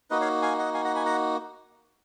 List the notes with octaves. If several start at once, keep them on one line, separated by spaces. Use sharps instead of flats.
A#3 D#4 F#4 B4 D#5
C#5 F5
F5 G#5
D#5 F#5
F5 G#5
F#5 A#5
G#5 B5
F#5 A#5